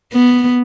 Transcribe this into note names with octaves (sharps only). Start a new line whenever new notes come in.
B3